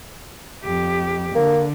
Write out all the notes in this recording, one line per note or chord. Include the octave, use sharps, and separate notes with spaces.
F2 G4
D3 A#3